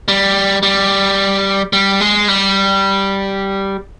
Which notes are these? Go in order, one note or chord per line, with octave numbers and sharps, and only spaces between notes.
G3
G3
G3
G#3
G3